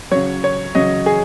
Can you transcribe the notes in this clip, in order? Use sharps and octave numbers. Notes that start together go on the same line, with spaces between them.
C#3 F#3 C#5
C#5
C#3 F#3 D#5
G#4